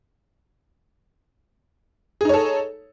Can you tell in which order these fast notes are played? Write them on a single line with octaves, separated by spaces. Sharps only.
G#4 D#4 C#5 A4